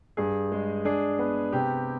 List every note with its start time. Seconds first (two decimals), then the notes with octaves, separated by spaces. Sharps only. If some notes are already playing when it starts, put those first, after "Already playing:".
0.17 G2 G#4
0.52 G#3
0.85 D4 G#4
1.19 B3
1.52 C3 G4